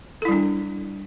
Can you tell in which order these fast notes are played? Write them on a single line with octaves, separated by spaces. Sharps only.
A4 E4 G3 D4